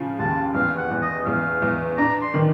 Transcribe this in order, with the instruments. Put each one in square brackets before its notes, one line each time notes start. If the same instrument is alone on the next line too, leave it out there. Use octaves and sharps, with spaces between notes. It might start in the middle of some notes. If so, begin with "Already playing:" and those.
Already playing: [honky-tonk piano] C#3 F3
[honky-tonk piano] D#2 [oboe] A5
[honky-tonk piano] E2 [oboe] F5
[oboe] F#5
[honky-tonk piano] E2
[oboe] D#5
[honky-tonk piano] E2 [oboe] F5
[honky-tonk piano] E2
[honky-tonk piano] D4 [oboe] A#5
[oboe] C6
[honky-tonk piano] D#3